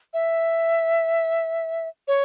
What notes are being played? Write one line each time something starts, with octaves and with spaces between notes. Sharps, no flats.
E5
C#5